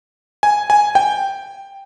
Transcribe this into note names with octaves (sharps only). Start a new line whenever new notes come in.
G#5
G#5
G5